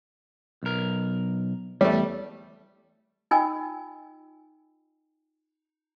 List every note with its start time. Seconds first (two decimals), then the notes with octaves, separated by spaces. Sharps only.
0.63 B1 A#4
1.81 E2 G3 A3
3.31 D#4 F4 D#5 G5 G#5 E6